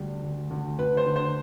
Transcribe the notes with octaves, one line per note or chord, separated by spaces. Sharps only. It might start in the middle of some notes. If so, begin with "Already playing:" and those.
Already playing: D2 G3
D2
D2
D2 B4
C5
D3
C5